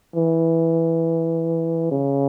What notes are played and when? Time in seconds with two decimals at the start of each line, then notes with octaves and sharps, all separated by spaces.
0.16 E3
1.92 C#3